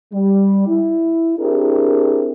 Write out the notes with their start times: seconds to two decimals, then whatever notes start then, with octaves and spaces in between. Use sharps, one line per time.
0.13 G3
0.67 E4
1.38 C4 D4 E4 G4 G#4 A#4